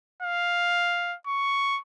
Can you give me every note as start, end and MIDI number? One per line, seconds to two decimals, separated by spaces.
0.23 1.15 77
1.27 1.80 85